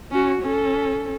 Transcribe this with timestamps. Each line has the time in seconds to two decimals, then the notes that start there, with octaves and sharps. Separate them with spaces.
0.11 C#4 F#4
0.42 C#4 A4